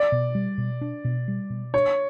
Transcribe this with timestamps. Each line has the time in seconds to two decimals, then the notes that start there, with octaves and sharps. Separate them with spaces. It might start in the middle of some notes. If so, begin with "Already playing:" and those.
Already playing: D5
0.12 B2
0.35 G3
0.58 B2
0.81 D4
1.05 B2
1.28 G3
1.50 B2
1.74 D4 C#5